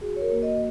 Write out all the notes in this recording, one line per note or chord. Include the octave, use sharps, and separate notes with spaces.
F#4 G#4
C#5
A#4
A#3
D#5